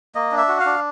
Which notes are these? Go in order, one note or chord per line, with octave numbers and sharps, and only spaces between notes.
A#3 D#5
D4
E5
F#4
F5
D4